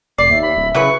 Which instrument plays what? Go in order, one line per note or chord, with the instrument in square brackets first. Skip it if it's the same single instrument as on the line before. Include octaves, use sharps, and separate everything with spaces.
[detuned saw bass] F1 [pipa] D5 [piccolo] C7
[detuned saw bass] D#2 [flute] E5
[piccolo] B5
[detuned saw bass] D1
[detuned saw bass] C#3 [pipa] F#3 E4 B4 [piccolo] C#6